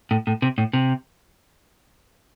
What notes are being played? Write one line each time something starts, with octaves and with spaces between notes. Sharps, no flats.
A2
A2
C3
A2
C3